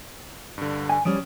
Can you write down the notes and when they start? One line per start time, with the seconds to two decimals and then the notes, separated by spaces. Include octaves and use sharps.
0.58 G2 D3
0.89 G#5
1.05 F3 G3 C#4 D#6 D7